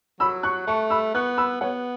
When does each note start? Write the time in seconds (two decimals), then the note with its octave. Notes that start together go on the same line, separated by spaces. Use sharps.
0.20 F#3 B5 E6
0.43 C#6 F#6
0.67 A3 A5 C#6
0.90 B5 E6
1.14 B3 C#6 F#6
1.37 B5 E6
1.61 B3 C#5 F#5